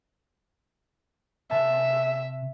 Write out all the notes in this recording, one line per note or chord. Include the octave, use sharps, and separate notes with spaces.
C3 E5 A5